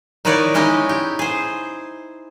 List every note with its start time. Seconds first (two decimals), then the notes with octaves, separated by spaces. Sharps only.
0.25 D#3 D#4 E4 B4 C#5 D5
0.54 G#3 C#4 D#4 E4 G4
0.89 G4
1.19 G#4 C5